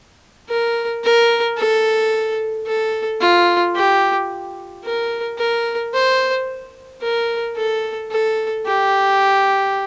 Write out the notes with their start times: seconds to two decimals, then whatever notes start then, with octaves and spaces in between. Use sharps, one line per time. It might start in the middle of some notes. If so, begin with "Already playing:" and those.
0.49 A#4
1.04 A#4
1.58 A4
2.67 A4
3.21 F4
3.75 G4
4.85 A#4
5.38 A#4
5.94 C5
7.02 A#4
7.57 A4
8.11 A4
8.66 G4